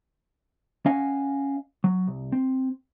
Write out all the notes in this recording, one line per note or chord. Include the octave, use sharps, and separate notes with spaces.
C#4 D#5 F5 F#5 G#5
F#3
C2
C4